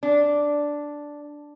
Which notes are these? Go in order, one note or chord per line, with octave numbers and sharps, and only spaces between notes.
D4